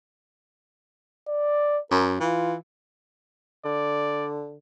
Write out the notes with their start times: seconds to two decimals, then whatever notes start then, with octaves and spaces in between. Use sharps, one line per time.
1.28 D5
1.91 F#2 A#4
2.20 E3 F4
3.65 D3 D5